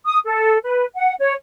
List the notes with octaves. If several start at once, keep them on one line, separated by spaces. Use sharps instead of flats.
D#6
A4
B4
F#5
C#5